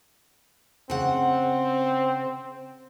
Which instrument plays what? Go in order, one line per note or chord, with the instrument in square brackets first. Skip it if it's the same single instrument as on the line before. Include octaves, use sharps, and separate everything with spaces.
[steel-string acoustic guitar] C#3 F#5 [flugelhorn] C4